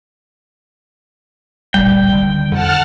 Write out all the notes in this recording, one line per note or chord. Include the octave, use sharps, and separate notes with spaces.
D1 G1 A#2 G3 G5
D3 D#3
F2 D3 D#3 F#5 A5 F6